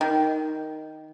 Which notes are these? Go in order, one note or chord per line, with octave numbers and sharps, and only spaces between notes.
D#3